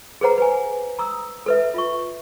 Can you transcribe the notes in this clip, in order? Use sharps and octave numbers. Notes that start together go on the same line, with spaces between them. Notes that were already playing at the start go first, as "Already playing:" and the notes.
G#4 A4 B4 C5 F#5 A#5
B4 G#5
A#5 D#6 E6
A4 B4 E5
F4 E5 C#6